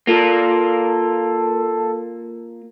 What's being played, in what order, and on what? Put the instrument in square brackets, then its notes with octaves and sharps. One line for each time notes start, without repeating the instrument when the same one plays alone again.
[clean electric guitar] A#3 F4 [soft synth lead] A4